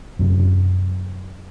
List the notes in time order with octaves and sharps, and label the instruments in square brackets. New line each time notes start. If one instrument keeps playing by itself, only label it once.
[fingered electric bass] F#2 C3